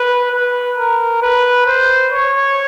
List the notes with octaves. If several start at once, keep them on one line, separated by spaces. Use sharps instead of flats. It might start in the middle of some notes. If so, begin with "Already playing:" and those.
Already playing: B4
B4
A#4
B4
C5
C#5